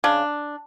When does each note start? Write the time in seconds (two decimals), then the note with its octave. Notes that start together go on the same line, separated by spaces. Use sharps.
0.04 C#3 D4